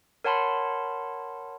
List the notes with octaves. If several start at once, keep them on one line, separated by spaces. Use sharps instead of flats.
A#4 C#5 F#5 A5 B5 C6